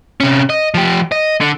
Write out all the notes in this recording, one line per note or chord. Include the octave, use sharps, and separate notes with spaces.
C3 C#4
D#5
F3 G4
D#5
D3